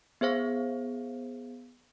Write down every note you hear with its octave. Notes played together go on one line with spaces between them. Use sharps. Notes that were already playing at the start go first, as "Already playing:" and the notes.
B3 G#4 C5 F5